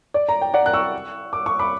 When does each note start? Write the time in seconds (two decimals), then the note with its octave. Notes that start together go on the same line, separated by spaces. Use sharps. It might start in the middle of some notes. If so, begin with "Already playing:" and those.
0.14 D5
0.29 A#5
0.41 G5
0.54 D5 F#5
0.66 F#6
0.73 C#6 E6
1.33 D6
1.46 C#6
1.59 B5 D6